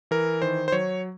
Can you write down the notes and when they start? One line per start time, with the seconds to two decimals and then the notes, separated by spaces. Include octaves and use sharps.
0.11 E3 A#4
0.42 D#3 C5
0.68 C5
0.72 F#3 C#5